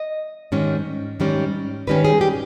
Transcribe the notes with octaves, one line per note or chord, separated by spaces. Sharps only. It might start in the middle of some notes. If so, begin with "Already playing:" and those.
Already playing: D#5
G#2 D#3 G3 C#4
G#2 D#3 G3 C#4
G#2 D#3 G3 C#4 B4
G#4
G4